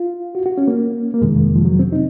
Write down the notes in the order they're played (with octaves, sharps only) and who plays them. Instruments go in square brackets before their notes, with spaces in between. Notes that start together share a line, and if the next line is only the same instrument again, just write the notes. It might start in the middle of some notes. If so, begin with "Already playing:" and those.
Already playing: [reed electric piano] F4
F#4
F#4
C#4
A#3
A#3
F2 C3 D#3 G#3
F3
F#3
C4
D#4